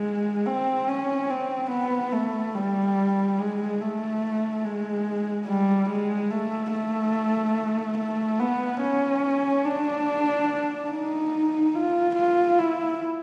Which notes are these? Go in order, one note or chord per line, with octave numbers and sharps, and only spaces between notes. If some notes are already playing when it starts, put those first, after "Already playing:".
Already playing: G#3
C4
C#4
C4
B3
A3
G3
G#3
A3
G#3
G3
G#3
A3
A3
A3
B3
C#4
D4
D#4
F4
F4
E4